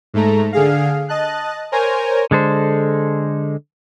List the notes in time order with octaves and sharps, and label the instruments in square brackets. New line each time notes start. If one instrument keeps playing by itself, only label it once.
[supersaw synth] G#2 A3 A#5
D3 G#4 F5
D#5 A5 F#6
A#4 C5 C#5 G#5 A#5
[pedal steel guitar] D3 G#3 A4 C5